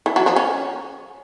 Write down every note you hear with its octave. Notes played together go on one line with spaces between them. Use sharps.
E3
F#3
F3
C#4